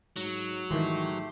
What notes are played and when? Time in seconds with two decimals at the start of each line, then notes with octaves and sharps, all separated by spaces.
0.16 G#2 F#3
0.71 G#2 D#3 E3 A3 G4 C6